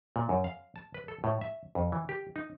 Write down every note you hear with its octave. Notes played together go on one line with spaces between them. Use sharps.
A#2
F#2
F5
A5
B4
A4
A2
E5
F2
E3
G4
D#4